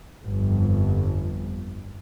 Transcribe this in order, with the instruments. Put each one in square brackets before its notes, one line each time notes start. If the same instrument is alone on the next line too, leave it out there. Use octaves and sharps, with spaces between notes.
[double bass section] G1 F2